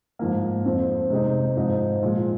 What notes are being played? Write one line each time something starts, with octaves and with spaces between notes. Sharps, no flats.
G#2 F3 A#3
F2 F3 C4
C3 G#3 C4 D#4
G#2 F3 C4 D#4
A#2 F3 G#3 F4